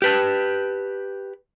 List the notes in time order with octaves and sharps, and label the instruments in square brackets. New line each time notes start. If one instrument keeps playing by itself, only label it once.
[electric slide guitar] G4 B4 A5